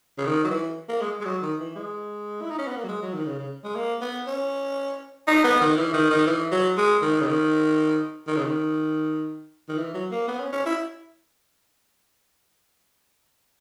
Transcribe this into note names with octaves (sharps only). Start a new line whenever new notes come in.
C#3
D#3
F#3
E3
A#3
G#3
G#3
F#3
D#3
E3
G#3
E4
D#4
C#4
B3
A#3
F#3
G#3
F#3
D#3
C#3
C#3
G#3
A#3
B3
C#4
D#4
B3
D#3
E3
D#3
D#3
E3
F#3
G#3
D#3
C#3
D#3
D#3
C#3
D#3
D#3
E3
F#3
A#3
B3
C#4
C#4
E4